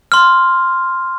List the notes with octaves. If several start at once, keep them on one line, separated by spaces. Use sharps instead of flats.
C6 F6